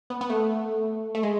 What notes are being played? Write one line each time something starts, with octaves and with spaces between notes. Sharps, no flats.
B3
B3
A3
A3
G#3